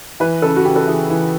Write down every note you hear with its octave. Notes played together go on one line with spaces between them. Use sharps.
E3 B4
C#3 A4
F#4
C#3 G4
A4
E3 G#4
E3